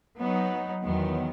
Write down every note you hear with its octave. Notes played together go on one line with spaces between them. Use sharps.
F#3 B3 D#4
E2 D#3 F#3 B3